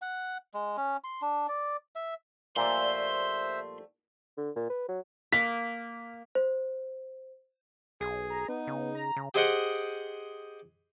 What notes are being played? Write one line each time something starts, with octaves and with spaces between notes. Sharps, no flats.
F#5
G#3
C#4
C6
D4
D5
E5
A#2 F3 G3 A3 C5 E5 C6
D3
A#2
B4
F#3
A#3 B6
C5
B1 G#4
A#5
B3 D#4
C#3
A#5
C#3
G4 G#4 C5 D#5 F#5 G5